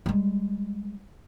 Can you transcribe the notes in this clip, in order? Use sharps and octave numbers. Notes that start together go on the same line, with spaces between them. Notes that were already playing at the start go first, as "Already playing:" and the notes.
G3 G#3